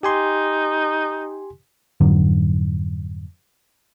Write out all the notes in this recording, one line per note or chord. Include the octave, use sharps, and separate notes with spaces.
D#4 G4 G#5 C6
F2 G#2 D3 F#3